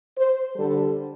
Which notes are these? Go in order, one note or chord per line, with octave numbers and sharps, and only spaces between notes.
C5
D3 G3 A4